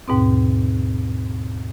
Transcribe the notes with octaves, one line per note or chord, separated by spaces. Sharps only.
D#2 G#2 B2 C4